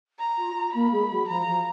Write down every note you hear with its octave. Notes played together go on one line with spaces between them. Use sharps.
A#5
F4
F4
A#3 B5
G#3
F#3
F3 A#5
F3